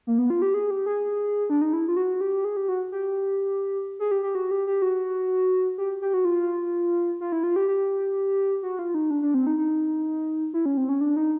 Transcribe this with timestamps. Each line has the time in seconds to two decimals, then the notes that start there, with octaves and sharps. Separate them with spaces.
0.07 A#3
0.18 B3
0.30 F4
0.42 G4
0.54 G#4
0.70 G4
0.86 G#4
1.50 D4
1.61 D#4
1.73 E4
1.88 F4
1.96 F#4
2.21 G4
2.45 G#4
2.57 G4
2.68 F#4
2.92 G4
3.99 G#4
4.11 G4
4.23 G4
4.35 F#4
4.51 G4
4.67 G4
4.82 F#4
5.78 G4
6.02 G4
6.14 F#4
6.25 F4
7.21 F4
7.32 E4
7.43 F4
7.56 G4
7.68 G4
8.63 F#4
8.79 F4
8.95 D#4
9.11 D4
9.22 D4
9.34 C4
9.47 D#4
9.58 D#4
10.53 E4
10.66 C#4
10.77 C4
10.89 C#4
11.01 D4
11.16 D#4